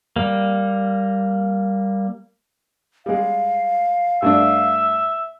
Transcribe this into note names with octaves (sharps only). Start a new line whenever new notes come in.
G3 A#3
G3 G#3 F5
G2 A3 D4 E5